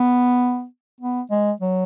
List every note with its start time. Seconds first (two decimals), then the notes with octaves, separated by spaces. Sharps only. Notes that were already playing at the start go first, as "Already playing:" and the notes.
Already playing: B3
1.00 B3
1.30 G#3
1.61 F#3